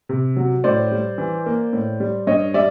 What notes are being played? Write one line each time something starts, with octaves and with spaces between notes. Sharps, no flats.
C3
F#3
A2 C5 D5
G3
E3
A#3
A2
G3
G2 C#5 D#5
G3 D5 E5